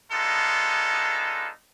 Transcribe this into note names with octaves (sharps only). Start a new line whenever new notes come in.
G#3 B3 D4 D#4 F4 A4